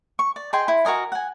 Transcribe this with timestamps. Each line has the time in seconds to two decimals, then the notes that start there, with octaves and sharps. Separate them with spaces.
0.19 C#6
0.36 D5
0.53 G#4 D#5 G5 C6
0.68 E4
0.85 F#4 A#4 D#5 G#5
1.12 F#5 G#5